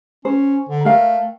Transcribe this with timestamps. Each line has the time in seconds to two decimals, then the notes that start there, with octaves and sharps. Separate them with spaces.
0.25 C#4 C5
0.69 D3
0.85 A3 A#4 F5 G5